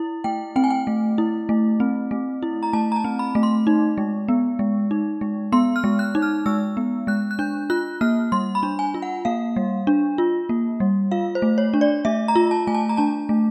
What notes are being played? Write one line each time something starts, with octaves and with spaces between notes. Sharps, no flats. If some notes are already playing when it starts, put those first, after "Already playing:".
Already playing: E4
A3 G5
C4 G5
G#5
G5
A3
E4
A3
C4
A3
E4
A#5
A3 A5
A#5
A5
C4
B5
A3
C6
D#4
G#3
B3
G#3
D#4
G#3
B3 C6
F6
G#3
F#6
D#4
F6
G#3 E6
B3
G#3 F#6
F#6
D4 G6
F4 F#6
A#3 F6
G3 C6
B5
D4
G#5
F4
F#5
A#3 F5
G3
D4
F4
A#3
G3
F4 F5
C5
A3
C#5
D4
D5
A3 E5
A#5
F4
A5
A3 G#5
A5
A#5
D4 A5
A3